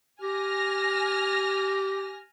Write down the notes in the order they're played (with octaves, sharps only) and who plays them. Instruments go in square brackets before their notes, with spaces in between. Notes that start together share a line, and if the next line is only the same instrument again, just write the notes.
[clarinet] G4 [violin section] G#5 F6 A#6